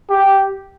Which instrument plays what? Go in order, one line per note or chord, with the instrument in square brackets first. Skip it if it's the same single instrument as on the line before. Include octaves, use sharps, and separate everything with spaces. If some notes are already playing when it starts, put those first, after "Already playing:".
[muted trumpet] G4